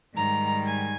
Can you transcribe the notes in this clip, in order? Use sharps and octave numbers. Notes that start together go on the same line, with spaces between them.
G#2 D#3 G3 A#5
G#5